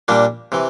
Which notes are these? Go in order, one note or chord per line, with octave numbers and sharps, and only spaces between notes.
A#2 G3 A#3 D4
C3 E3